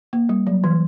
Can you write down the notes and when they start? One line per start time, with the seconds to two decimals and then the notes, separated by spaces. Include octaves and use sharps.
0.13 A#3
0.29 G3
0.47 F#3
0.64 E3